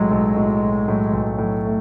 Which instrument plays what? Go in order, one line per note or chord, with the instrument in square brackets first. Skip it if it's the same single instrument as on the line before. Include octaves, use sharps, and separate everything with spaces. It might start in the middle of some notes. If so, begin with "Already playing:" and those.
Already playing: [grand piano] B1 A2 F#3 [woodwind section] G#3
[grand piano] B1
A2 F#3
B1
A2 F#3
B1
A2 F#3
[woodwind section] A3